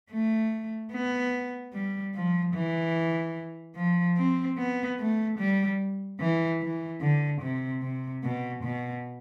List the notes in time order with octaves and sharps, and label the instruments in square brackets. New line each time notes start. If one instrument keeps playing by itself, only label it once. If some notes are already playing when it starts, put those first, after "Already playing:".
[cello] A3
B3
G3
F3
E3
F3
C4
B3
A3
G3
E3
E3
D3
C3
C3
B2
B2